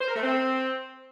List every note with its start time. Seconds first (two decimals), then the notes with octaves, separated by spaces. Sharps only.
0.01 C5
0.08 A#4
0.16 A3
0.23 C4